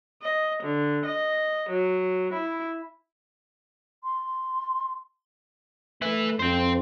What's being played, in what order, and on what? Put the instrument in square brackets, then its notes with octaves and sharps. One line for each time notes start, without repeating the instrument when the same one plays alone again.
[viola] D#5
D3
D#5
F#3
E4
[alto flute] C6
[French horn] A3 [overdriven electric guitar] E4 B4
[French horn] F2 [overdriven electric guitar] C5 G5